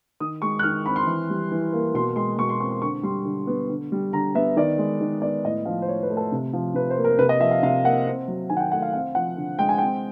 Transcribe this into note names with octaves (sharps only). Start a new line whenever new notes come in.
D#3 D#6
G#3 C#6
F#6
D#3 F6
C4 B5
C6
E3
G3
E3
A#3
B2 C6
G#3 C6
B2 C#6
C6
C4 C#6
C6
D3 C#6
G3 C6
D3
B3
D3
G3
D3 A#5
B3 E5
D#3 D5
G#3
D#3
B3 D5
A2 D#5
F3 F5
C5
A2 C#5
B4
A3
A4
C3
F3
C3 B4
C5
A#3
A#4
C3 B4
D#5
F3 E5
F5
C3 F5
A#3 F#5
C4
F#3
D#3 G#5
F#5
G5
A3 F#5
F5
C4 F5
F3 F#5
D3
G#3 G5
G#5
C4 G5